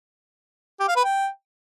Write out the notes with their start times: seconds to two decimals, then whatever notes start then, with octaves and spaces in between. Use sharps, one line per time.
0.80 G4
0.88 F5
0.96 B4
1.04 G5